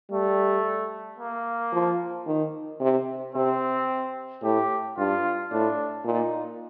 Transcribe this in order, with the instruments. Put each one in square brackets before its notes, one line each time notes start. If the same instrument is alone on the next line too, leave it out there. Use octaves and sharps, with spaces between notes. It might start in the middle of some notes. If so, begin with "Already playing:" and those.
[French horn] G3 [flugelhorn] A3
[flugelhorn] A#3
[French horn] F3
D#3
C3
[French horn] C3 [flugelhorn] C4
[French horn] A2 [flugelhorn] G4
[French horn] G2 [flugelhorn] F4
[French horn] A2 [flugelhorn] D4
[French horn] A#2 [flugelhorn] D#4